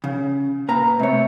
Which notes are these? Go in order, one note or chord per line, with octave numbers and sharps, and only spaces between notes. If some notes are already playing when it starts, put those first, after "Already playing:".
C#3
A#2 B4 A#5
C3 A3 C#5